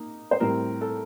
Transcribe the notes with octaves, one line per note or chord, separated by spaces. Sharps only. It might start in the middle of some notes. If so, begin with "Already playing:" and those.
Already playing: A#3 D#4
C5
A2 G3 C4 A#4
A4